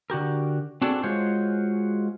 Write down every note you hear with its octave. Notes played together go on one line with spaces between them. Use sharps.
D3 F#4 G4 A#4
C4 D4 F#4 G#4 A4 D5
G#3 F4 F#4 G#4 C5 C#5